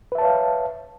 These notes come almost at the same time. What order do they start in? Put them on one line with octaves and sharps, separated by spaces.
B4 E5 A5 C#5 F5